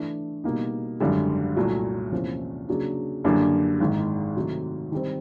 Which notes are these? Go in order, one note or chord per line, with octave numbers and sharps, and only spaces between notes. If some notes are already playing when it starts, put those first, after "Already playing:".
Already playing: E3 A3 D4
B2 G3 A#3 D#4
G#1 F#2 D3 G3
C2 A#2 F#3 A3
E2 C3 F3 A#3 C#4
C#3 F#3 A#3 D4
F#2 D3 G3 A#3 D4
G#1 G#2 D#3
C3 D#3 F#3 A3
D#3 G3 C4